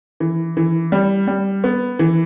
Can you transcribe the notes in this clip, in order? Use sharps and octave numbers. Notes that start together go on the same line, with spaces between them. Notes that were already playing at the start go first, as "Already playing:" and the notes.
E3
E3
G3
G3
B3
E3